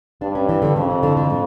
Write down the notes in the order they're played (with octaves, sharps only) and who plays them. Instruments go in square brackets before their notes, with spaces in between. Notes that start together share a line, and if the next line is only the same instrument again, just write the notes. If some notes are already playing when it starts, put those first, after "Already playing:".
[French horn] G2 [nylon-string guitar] D4
[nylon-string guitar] C#4
E3
D3
[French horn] F2 [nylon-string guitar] C#3
[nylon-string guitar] E3
D3
D3
A2